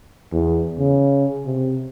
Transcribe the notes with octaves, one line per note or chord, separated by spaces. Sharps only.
E2
C#3
C3